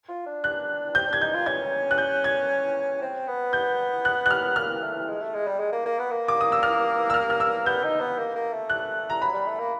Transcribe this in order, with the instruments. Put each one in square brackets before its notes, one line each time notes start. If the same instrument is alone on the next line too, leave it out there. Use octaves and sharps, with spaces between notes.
[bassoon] F4
D4
[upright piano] F#6
[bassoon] C4 [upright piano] G6
[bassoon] D4
[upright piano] G#6
[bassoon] D#4 [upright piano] G6
[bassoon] F4
[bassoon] C#4 [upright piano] G#6
[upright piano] F#6
G6
G#6
[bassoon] C4
B3
[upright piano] G6
F#6
F#6
F6
[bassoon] A#3 [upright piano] F6
[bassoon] A3
G#3
A3
G#3
G3
G#3
A#3
A#3
B3
A#3
[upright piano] D6
D#6
E6
F6
E6
F6
F6
E6
[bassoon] B3 [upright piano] G6
[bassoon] D#4
B3
A#3
A#3
A3
[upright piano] F#6
A#5
[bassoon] F#3 [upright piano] B5
[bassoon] G3
A3
A#3